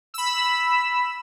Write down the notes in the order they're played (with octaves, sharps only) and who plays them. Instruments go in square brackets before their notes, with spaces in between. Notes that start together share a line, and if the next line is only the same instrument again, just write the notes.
[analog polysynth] B5 E6